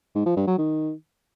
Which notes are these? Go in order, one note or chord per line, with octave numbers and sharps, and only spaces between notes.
G#2
F3
G2
F#3
D#3